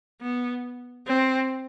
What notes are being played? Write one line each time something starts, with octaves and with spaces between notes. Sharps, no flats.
B3
C4